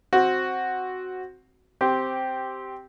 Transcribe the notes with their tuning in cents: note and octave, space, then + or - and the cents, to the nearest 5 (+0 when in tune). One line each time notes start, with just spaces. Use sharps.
C4 +10 F#4 +0
C4 +0 G4 -10